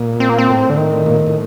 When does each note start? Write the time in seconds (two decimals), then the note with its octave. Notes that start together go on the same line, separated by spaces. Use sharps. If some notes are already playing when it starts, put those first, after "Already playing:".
Already playing: A#2
0.20 C4
0.29 A#3
0.38 C4
0.49 A2
0.70 D3
0.77 D#3
1.06 A#2
1.16 A2
1.26 A2